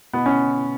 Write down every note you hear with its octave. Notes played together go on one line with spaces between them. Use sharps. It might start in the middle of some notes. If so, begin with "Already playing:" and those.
B2 B3
C#4